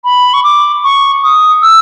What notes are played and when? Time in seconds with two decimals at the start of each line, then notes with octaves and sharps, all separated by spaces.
0.04 B5
0.34 C#6
0.43 D6
0.84 C#6
1.24 D#6
1.62 E6